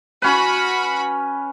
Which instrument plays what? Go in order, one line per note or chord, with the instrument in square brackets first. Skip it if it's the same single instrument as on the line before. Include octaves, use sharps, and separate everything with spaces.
[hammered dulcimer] C#4 B4 [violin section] F#4 B5